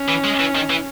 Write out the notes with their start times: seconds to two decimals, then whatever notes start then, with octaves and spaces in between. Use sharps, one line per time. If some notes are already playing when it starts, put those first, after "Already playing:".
Already playing: C#4
0.08 E3
0.24 G#3
0.40 E3
0.55 D#3
0.70 E3